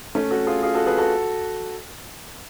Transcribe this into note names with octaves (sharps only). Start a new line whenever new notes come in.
A3 C#4
F#4 A4
F4 G#4
F4 G#4
F#4 A4
G#4 B4
F#4 A4